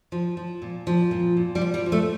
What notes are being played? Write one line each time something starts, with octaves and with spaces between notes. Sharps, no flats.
F3
F3
A#2
F3
A#2
A#2
G3
F3
G3
F3
A3